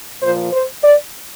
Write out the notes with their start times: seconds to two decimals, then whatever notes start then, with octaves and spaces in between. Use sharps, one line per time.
0.22 A#2 F3 C5
0.52 C5
0.84 D5